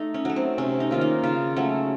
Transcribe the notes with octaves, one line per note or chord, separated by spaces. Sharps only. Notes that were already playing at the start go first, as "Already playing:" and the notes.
Already playing: A3 D#4 A4
C#4
F#3 A3
C4
C3 C#4
D#4
D#3 A#3 F4
D#4
C#3 F4
F#3 A3 C#4